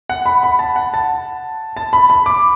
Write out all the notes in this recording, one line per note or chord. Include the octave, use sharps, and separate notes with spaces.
F#5
B5
B5
A5
F#5
A5
A5
B5
B5
D6